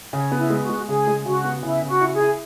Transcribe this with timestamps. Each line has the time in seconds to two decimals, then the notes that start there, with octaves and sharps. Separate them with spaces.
0.13 C#3 C#5
0.31 B3
0.38 E4
0.50 G#3
0.63 F#4
0.69 G#3
0.88 C#3 G#4
1.07 G#3
1.25 C#3 F#4
1.45 B3
1.63 C#3 E4
1.82 C#3
1.87 F#4
2.01 E4
2.13 G#4
2.20 E4